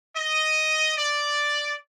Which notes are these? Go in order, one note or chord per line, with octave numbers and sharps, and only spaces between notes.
D#5
D5